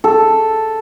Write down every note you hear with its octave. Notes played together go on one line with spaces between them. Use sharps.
A4